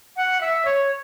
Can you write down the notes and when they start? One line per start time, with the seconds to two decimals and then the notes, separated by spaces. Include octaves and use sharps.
0.16 F#5
0.41 E5
0.65 C#5